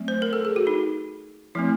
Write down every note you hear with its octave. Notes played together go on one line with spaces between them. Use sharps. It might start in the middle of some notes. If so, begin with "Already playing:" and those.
Already playing: F#3 A3 C4
C5
A#4
A4
G#4
F#4
D#4
F3 A3 C4 E4